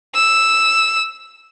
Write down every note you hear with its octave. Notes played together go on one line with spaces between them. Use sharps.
E6